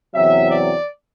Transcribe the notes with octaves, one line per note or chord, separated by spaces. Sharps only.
E2 C3 F#3 E5
D5